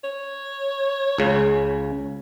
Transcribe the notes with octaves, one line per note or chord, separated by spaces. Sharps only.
C#5
C#2 C#3